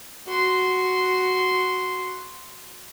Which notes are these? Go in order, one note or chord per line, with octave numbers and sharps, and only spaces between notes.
F#4 C6